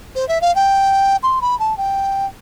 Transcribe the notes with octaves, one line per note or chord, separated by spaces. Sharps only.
C5
E5
F5
G5
C6
B5
A5
G5